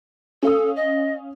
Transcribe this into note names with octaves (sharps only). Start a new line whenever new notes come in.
C#4 A4 F5 D#6
D#5